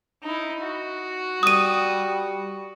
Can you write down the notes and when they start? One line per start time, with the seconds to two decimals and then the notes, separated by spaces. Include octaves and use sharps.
0.23 D#4 E4
0.61 F#4
1.43 G3 D#6 D#7